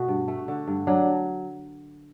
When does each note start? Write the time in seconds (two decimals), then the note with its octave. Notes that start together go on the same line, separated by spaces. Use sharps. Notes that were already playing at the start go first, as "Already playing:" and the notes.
Already playing: B2 A3 F#4
0.08 G2
0.28 A3
0.48 D3
0.67 G2
0.87 F#3 D4